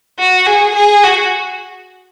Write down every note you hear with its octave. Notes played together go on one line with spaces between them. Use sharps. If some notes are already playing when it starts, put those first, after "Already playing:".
F#4
G#4
G#4
F#4